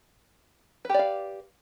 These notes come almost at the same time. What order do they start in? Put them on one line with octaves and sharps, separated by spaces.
B4 G4 D5 F5